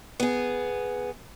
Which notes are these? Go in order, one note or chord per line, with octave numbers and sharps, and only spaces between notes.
B3 G#4